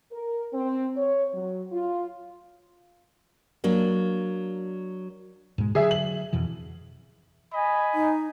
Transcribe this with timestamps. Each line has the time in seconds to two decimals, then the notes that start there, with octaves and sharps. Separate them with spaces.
0.12 A#4
0.53 C4
0.96 C#5
1.34 F#3
1.72 F4
3.64 F#3 A#3 D4
5.58 G#2 B2 G#3
5.75 D3 E3 F#3 G#4 E5
5.91 F#7
6.33 F2 B2 E3
7.54 D#5 G#5 B5
7.94 D#4